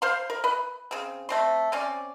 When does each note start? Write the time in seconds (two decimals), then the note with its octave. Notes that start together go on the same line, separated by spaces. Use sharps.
0.02 C5 F5 C6
0.30 A#4
0.44 B4
0.91 C#3 C4
1.29 A3 C4 C6
1.72 C4 C#4 D5